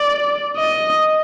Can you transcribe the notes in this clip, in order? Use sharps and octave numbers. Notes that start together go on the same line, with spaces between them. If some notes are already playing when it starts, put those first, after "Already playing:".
Already playing: D5
D#5